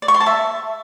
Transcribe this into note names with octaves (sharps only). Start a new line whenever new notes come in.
D5
C#6
C6
A5
E5